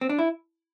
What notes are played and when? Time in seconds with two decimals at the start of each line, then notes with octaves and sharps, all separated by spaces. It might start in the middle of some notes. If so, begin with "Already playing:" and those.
0.01 C4
0.09 D4
0.19 E4